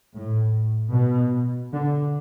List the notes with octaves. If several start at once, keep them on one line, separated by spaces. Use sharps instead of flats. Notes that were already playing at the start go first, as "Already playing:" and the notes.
A2
B2
D3